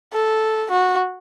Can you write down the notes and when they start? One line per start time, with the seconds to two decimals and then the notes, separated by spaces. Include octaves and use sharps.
0.13 A4
0.71 F#4